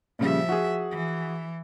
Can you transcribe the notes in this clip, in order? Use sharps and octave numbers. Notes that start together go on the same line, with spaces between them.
A#2 C#3 F3 G3 E5
F#4 G#4
E3